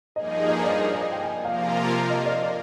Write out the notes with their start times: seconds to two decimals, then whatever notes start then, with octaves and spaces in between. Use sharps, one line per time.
0.15 G2 F3 A#3 D#4 G#4 D#5
0.48 D#5
0.64 D5
0.80 C5
0.92 D5
1.02 D#5
1.12 G5
1.23 G#5
1.45 C3 F3 A#3 F4 A#4 F5
2.10 D#5
2.26 D5
2.42 D5